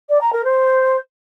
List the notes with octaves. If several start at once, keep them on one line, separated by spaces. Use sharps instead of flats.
D5
A#5
A#4
C5